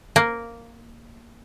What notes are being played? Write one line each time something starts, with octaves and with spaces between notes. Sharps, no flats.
A#3